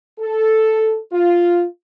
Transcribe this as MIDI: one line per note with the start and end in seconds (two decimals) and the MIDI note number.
0.20 0.98 69
1.12 1.64 65